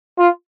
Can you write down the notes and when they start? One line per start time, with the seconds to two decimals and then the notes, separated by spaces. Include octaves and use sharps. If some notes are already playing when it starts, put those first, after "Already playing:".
0.18 F4